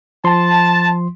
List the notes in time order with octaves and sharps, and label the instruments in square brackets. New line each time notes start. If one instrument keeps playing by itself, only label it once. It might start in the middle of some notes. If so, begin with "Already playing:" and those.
[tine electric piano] F3 C6 [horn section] A5